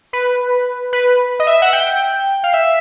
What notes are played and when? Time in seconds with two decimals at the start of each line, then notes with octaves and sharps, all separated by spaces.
0.13 B4
0.93 B4
1.39 D#5
1.47 E5
1.62 F#5
1.73 G5
2.43 F5
2.53 E5